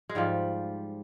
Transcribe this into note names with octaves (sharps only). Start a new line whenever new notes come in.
G#3
G#2 F3 G3